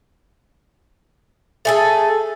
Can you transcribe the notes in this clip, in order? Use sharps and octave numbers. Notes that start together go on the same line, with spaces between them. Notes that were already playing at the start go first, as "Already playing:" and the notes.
A3 G#4 A4